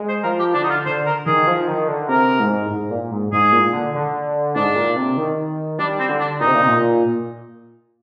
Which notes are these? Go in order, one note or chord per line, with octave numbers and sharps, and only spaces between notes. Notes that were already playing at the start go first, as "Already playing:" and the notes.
Already playing: G#3
C5
F3 A#4
G4
D3 D4
D#4
F4
D3 C5
A#4
D#3 G#4
F3
D#3
D3
C3 A#4
G#2
G#2
A#2
G#2
G#2 G#4
A#2
D3
D3
G#2 D4
A#2
C3
D#3
G3 D4
C4
D3
D4
A#2 D#4
C3
A#2
C3
A#2